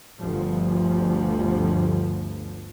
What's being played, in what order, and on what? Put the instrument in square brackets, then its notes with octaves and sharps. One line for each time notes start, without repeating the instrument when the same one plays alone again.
[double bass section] G1 D2 F3